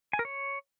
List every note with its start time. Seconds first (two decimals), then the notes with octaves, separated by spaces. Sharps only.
0.13 G#5
0.19 A#4
0.25 C#5